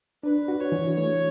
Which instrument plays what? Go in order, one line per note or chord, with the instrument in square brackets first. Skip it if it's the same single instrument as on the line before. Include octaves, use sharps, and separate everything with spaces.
[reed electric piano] D4 [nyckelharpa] B4
[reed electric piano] F#4
[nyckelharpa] C#5
[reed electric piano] E3
[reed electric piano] A3 [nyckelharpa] C#5